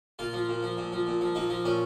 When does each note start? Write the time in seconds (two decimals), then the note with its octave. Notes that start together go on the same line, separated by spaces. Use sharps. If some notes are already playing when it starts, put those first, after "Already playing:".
0.19 A#2 F4
0.33 F3
0.49 A#2
0.63 F3
0.77 A#2
0.92 F3
1.07 A#2
1.21 F3
1.35 A#2 D#4
1.50 F3
1.65 A#2 C#4